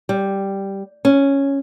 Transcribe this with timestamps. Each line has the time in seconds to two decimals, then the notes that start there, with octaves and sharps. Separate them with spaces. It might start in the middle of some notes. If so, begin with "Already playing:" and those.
0.09 G3
1.05 C#4